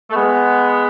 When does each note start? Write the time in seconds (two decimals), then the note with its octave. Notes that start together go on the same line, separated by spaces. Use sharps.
0.10 A3
0.15 G#3 B3